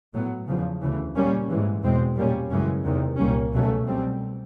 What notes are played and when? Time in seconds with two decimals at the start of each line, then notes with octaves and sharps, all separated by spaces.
0.13 A2 F#3 B3
0.47 E2 C#3 F3
0.81 D2 C#3 E3
1.15 A#2 G3 A#3 C#4
1.49 G#2 E3 G#3
1.83 E2 B2 G#3 C4
2.17 A#2 G3 A#3 C#4
2.51 F#2 C#3 E3 G#3 C#4
2.84 E2 C3 D#3
3.18 C2 A#2 G3 A#3 C#4
3.53 C#2 B2 F#3 A3 C#4
3.86 B2 G3 C4